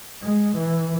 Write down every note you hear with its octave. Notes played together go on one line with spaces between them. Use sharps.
G#3
E3